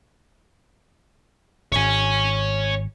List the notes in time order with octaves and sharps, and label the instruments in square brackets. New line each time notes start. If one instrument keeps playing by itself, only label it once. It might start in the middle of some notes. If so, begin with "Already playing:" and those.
[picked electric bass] D1 G#1 [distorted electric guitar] C#5 G#5